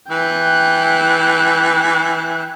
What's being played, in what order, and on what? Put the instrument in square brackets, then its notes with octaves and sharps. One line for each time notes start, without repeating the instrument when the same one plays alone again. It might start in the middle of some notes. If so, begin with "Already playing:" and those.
[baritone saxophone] E3 [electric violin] G5 F#6